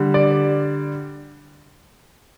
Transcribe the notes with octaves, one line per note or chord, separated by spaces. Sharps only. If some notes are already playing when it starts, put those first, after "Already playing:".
Already playing: D3 G3
D5